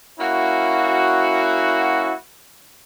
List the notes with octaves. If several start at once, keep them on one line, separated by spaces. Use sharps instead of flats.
A#3 C#4 E4 F#4